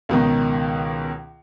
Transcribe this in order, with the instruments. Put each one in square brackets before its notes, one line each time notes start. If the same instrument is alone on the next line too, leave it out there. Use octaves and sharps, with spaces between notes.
[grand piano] C#2 B2 D#3